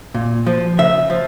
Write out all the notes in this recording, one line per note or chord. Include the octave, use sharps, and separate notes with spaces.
A#2
F3
C#3 E5
F3